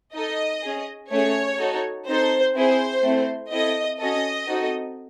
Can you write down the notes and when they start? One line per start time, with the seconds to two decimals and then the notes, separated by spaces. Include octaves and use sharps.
0.14 D#4 A4 D#5
0.62 C#4 G#4
1.10 A3 C#4 G#4 C#5
1.58 D#4 F#4 A4
2.06 C4 D#4 A4 C5
2.55 C4 E4 G#4 C5
3.03 A3 C4 E4
3.51 C4 E4 A4 D#5
4.00 C#4 F#4 A4 D#5
4.48 C4 D#4 F#4 A4